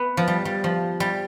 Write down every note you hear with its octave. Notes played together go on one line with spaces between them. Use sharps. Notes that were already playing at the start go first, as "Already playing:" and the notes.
Already playing: B3
F3
G3
G3
F3
G3